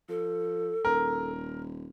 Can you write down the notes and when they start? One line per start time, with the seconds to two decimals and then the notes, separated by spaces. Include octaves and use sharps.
0.09 F3 A4
0.85 D#1 A#4